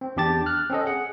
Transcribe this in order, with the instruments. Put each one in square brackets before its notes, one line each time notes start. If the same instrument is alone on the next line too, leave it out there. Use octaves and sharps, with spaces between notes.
[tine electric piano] C4
E2 D4 G4 A5 A6
F6 F#6
C4 C#4 A4 D#5
G#4 F#5